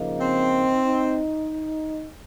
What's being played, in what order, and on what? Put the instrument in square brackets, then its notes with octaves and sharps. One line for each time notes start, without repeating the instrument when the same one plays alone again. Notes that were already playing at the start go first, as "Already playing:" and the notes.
Already playing: [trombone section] C#3 F3 A#3 D#4
[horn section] C4
[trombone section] D#4